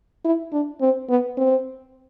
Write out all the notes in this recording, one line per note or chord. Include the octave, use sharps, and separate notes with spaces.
E4
D4
C4
B3
C4